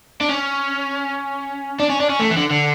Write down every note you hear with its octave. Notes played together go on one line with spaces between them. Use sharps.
D4
C#4
D4
C#4
D4
C#4
A3
E3
D3
D3